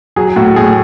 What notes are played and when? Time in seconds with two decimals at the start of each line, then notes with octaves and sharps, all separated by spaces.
0.16 F#3 G#4
0.36 A2 F#4
0.56 A2 G#4